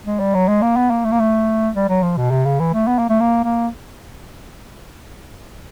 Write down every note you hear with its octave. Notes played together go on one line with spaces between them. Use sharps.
G#3
G3
F#3
G#3
A#3
B3
A#3
A3
A#3
A3
G3
F#3
F3
B2
C3
C#3
E3
A3
B3
A#3
A3
A#3
A#3